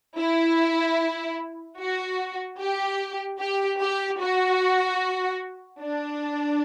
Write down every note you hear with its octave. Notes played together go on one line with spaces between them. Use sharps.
E4
F#4
G4
G4
G4
F#4
D4